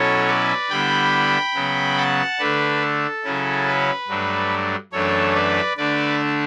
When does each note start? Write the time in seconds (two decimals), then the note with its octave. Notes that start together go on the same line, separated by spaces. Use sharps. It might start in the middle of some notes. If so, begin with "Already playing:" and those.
Already playing: B2 F#3 C#4 E4 A4 C#5
0.28 B4 D5
0.70 D3 G3 B3 E4 G5 B5
1.55 C#3 F#3 B3
1.97 F#5 A5
2.39 D3 A3 D4 B4
2.81 A4
3.23 C#3 F#3 C#4 E4
3.66 B4
4.08 G2 F#3 A3 D4
4.92 F#2 E3 A3 D4 A4 C#5
5.35 B4 D5
5.77 D3 A3 D4 B4 D5